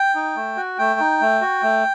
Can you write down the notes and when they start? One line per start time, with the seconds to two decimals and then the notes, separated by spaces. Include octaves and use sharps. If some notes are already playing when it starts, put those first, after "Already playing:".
Already playing: G5
0.15 D#4
0.36 A3
0.57 F#4
0.78 A3 G5
1.00 D#4
1.21 A3
1.41 F#4
1.63 A3